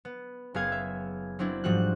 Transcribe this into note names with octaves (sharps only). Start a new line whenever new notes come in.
B3
F#1 B3 G#4 F5 G#6
E5
F#3 C4 D4 E4
G#2 F3 G3 F#4 F#6